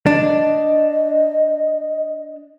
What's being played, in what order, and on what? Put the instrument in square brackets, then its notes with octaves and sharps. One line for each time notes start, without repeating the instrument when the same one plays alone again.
[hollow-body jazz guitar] D4 [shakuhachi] D#5